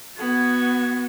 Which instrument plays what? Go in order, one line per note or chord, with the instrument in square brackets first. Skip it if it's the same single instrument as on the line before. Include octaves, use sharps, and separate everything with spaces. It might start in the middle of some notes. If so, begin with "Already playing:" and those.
[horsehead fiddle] B3 F#4 [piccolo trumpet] G#6